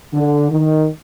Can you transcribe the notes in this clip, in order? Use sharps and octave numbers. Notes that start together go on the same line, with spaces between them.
D3
D#3